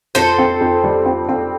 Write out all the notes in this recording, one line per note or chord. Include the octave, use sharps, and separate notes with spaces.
F2 A4 C5
C4
F2
G3
C4
C4